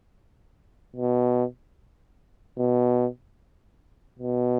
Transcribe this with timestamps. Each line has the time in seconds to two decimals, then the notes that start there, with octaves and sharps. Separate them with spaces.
0.96 B2
2.58 B2
4.19 B2